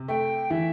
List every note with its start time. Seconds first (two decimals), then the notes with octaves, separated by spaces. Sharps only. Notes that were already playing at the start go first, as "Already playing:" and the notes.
Already playing: C3
0.08 A3 G5
0.50 E3 E5